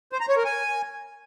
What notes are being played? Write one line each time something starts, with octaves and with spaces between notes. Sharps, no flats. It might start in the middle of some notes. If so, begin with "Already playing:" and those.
C5
A#5
C#5
A#4
G#5